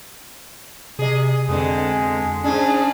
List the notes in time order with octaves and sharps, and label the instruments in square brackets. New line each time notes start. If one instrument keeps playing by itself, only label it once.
[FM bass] C3 [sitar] G#4 D#5
[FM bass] F2 [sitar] B2 D3 [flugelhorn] G#3
[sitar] G#2 D4 [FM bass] C#4 [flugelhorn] G#4